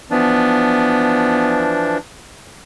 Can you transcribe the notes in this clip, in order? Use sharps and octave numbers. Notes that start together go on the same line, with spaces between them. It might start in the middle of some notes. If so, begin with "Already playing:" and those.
E3 F3 B3 D4